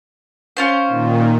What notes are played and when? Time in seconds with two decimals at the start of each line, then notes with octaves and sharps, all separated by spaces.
0.57 C#4 F4 C5
0.87 A#2 D#3